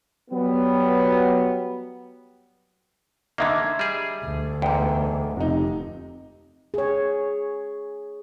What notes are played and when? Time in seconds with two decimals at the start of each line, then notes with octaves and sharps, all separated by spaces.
0.31 F#3 G3 B3
3.38 D3 D#3 A#3 D#5 E5 G#6
3.79 G3 G#4
4.24 D2
4.62 E2 G#2 G5
5.37 F1 C3 D#4
6.74 G#4 C#5